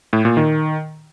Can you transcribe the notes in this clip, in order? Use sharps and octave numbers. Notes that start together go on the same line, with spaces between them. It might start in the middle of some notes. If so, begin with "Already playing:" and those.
A2
A#2
D#3